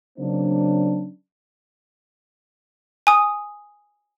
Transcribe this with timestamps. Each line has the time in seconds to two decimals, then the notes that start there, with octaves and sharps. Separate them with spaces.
0.19 C#3 F#3 A#3 C4 D4
3.07 G#5 D#6